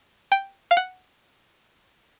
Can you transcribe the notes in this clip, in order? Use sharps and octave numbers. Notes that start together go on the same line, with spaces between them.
G5
F5
F#5